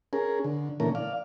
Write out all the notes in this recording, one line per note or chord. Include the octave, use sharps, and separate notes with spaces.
C#4 G#4 A#4
D3
A#2 D3 E3 A3 C#4 A#4
D5 F5